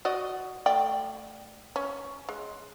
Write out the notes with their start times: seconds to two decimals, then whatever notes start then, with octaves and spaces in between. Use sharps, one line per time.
0.05 F#4 D5 D#5
0.66 A3 D5 G5
1.76 C#4
2.29 G#3